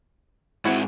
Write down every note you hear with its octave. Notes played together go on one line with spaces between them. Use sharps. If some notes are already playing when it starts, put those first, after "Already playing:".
G#2 C4 E4 F#4